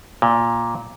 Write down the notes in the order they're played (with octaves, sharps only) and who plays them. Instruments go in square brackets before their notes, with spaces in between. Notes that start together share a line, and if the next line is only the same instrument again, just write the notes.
[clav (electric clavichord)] A#2